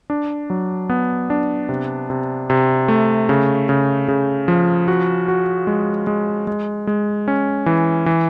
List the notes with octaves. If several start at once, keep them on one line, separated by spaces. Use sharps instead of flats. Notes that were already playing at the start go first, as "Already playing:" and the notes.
D4
F#3
B3
D4
C3
C3
C3
A3
C#3
C#3
C#3
F3
F#4
F#4
G#3
G#3
G#3
G#3
C#4
E3
E3